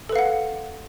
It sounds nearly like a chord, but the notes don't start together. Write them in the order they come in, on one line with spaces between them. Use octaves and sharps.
A4 B4 F5 F#5